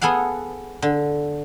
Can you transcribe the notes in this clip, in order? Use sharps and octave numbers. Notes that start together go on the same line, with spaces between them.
B3 G#4 A4 F5 F#5
D3